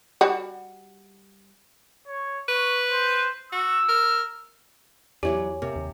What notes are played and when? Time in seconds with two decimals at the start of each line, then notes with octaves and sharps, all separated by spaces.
0.21 G3 F#4 F#5
2.07 C#5
2.48 B4 C#6
2.91 C5
3.52 F#4 E6
3.89 A#4
5.23 E2 F#3 E4 G4 C#5 D5 G#5
5.62 C3 A#3
5.76 D#2